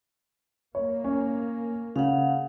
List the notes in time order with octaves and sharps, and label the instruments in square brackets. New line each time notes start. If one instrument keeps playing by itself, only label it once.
[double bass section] A#3 [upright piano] C#5
[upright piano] C#4
[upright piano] C#3 [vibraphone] F5 F#5